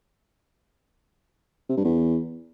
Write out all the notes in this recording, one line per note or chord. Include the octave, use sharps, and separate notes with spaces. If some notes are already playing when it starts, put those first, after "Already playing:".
C3
G2
E2